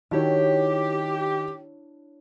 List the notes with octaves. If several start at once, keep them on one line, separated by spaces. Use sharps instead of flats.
D#3 D4 E4 F#4 G4 C#5